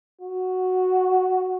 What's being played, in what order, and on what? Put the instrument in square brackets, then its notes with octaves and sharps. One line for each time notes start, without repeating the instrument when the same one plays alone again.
[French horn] F#4